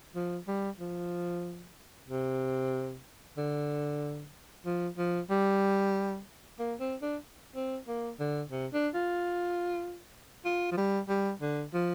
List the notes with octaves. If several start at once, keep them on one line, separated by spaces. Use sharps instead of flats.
F3
G3
F3
C3
D3
F3
F3
G3
A#3
C4
D4
C4
A#3
D3
C3
D4
F4
F4
F3
G3
G3
D3
F3